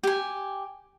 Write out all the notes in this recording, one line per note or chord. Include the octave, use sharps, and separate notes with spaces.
G4 G#5